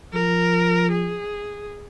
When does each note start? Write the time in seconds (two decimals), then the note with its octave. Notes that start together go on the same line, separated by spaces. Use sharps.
0.13 F3 A#4
0.91 G#4